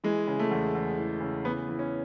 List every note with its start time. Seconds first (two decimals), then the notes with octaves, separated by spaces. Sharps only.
0.04 E3 G#3
0.27 C#3
0.39 A3
0.51 E2
0.74 E2
0.98 E3
1.20 C#3
1.45 E3 B3
1.68 E3
1.79 C#4